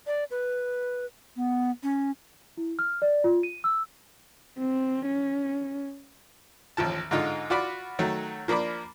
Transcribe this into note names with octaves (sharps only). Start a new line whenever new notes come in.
D5
B4
B3
C#4
E4
F6
D5
F4
D#7
E6
C4
C#4
A1 D#2 F3 A5
G#2 D3 D#4 F4
F4 F#4 D5 B5
D#3 F#3 A3
F3 A#3 D4 B5 D6